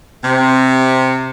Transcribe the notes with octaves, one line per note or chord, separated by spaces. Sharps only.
C3